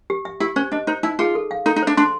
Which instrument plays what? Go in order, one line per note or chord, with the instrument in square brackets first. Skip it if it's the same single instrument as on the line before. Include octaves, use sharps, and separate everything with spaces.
[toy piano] G4
E5
[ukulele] E4 [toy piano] G4
[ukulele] C#4 [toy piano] C5
[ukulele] D4 [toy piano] D#5
[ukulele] D#4 [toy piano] C5
[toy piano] D#4 [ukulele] E4
[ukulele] F4 [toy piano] G#4
[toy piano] A4
F5
[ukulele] D#4 [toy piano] A4
[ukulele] D#4
[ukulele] D4 [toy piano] C5
[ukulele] D4 [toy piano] C6